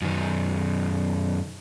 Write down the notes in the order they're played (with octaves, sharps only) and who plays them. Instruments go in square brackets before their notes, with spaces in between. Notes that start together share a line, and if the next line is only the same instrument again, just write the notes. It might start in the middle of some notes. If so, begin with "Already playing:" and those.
[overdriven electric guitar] F#2 D#3